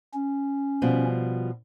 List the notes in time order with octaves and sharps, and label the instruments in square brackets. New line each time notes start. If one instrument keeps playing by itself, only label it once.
[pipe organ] C#4
[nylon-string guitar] B2 F3 G3